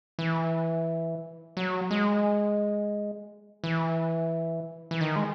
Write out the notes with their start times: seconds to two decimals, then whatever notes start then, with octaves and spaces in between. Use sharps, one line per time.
0.19 E3
1.57 F#3
1.91 G#3
3.64 E3
4.91 E3
5.01 D#3
5.16 G#3